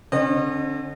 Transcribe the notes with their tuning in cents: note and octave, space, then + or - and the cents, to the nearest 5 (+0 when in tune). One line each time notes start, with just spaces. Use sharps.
D3 +0 C4 +45 D#5 -30